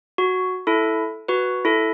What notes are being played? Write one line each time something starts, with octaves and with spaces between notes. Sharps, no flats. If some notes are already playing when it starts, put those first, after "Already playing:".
F#4
E4 A4
F#4 B4
E4 A4